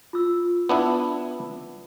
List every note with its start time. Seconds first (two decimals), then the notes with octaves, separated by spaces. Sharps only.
0.13 F4 E6
0.69 B3 D4 E4